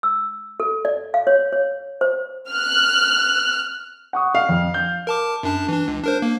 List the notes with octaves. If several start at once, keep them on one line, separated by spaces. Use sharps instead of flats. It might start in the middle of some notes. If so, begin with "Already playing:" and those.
E6
A4
D5
F5
C#5
C#5
C5
F6 F#6
F#5 C#6 D#6
F5
F2 F6
G6
A#4 A5 D6
F#2 D4 A5
E3 D4
C#2
D4 A#4 C5
A#3